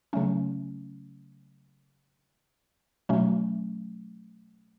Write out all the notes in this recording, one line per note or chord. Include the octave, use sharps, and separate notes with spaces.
C#3 F#3 A3 C#4
B2 F#3 A3 C#4